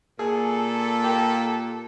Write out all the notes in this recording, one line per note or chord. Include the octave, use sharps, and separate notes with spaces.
A#2 G#4 A4
A#3 G4